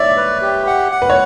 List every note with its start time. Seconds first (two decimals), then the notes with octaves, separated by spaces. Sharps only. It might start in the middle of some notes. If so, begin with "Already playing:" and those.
Already playing: C#5 D5 E5
0.17 B4
0.42 G4
0.67 F#5
0.91 F#5
1.02 B4
1.10 C#5